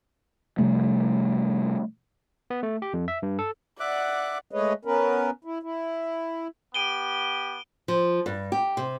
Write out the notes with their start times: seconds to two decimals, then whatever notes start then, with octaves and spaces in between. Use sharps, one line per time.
0.58 C3 F3 G3 A3
2.50 B3
2.63 A3
2.82 G4
2.93 F2
3.08 E5
3.23 G2
3.39 A4
3.80 D5 E5 F#5 D6 F#6
4.51 G#3 A3 G#4 B4 C#5 D#5
4.85 B3 C#4 A#4 B4
5.45 E4
5.63 E4
6.74 B3 G4 D7 D#7 G7
7.88 F3
8.26 G2
8.52 G4
8.77 C3